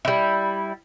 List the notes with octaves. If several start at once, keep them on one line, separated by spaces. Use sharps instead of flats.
G3 E4